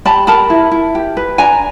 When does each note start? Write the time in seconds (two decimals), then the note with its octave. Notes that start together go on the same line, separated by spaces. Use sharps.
0.05 G4 A5 B5
0.27 A#4 A5 B5
0.50 E4
0.72 E4
0.95 G4
1.17 B4
1.38 D4 G#5 A#5